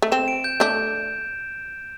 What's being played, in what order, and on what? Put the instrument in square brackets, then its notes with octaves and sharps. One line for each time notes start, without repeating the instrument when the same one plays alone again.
[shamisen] A3
[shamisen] C4 [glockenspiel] E7
[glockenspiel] D7
G6
[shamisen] A3 D4 [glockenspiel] G6